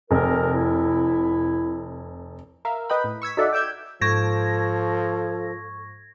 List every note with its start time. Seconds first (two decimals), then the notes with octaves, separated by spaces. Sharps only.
0.11 F1 A#4
0.53 E4
2.65 A#4 E5 F5
2.90 B4 D#5 G5 B5
3.04 A2
3.22 C#6 E6 G#6 B6
3.37 D#4 F#4 A4 D5 E5 F#5
3.53 G5 D6 E6 G6 G#6
4.01 G#2 F3 A4 C#6 G#6 A#6